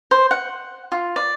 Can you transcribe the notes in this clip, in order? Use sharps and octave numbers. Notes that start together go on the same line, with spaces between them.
C5
F#5
F4
D5